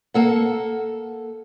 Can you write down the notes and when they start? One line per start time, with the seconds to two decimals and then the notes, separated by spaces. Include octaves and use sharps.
0.14 A#3 A4 F#5